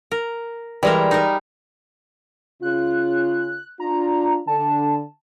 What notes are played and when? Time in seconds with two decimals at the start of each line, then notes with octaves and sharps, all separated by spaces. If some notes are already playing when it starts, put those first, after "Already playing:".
0.11 A#4
0.83 E3 G3 G#3 A#4
1.11 D#4 A#4
2.63 C#3 F4 F#6
3.80 D4 F4 A#5
4.47 D3 A5